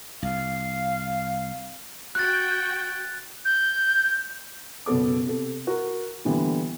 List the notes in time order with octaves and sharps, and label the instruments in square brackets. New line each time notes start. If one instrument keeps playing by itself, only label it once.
[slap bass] C2 [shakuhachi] F5
[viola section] F#4 G5 [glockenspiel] F#6 A6
[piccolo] G6
[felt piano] F#1 B2 B3 A4 D6
C3 A4
F#4 A#4
A#2 D3 E3 G3 B3